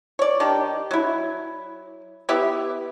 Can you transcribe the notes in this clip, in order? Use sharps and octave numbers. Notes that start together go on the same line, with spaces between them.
C#5 D5
D#3 D4 G4
F#3 E4
B3 E4 G4 E5